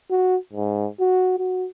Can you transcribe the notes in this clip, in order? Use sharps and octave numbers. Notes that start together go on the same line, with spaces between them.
F#4
G#2
F#4
F#4